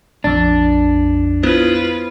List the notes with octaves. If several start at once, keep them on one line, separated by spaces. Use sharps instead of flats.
A#1 F2 D4 A6
B3 E4 F4 B4 C5